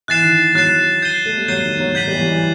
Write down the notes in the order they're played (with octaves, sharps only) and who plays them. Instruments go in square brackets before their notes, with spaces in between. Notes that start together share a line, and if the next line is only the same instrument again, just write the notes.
[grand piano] E3 [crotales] F#6 A6 C7 E7
[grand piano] D#3
[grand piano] F#3 [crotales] F#6 A6 C7 E7
[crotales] G6 C7 D#7 G7
[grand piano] A3
G3
[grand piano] F#3 [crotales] G6 C7 D#7 G7
[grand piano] D#3
F#3
[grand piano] F#3 [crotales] G6 B6 D#7 F#7
[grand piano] G3
E3
F#3
E3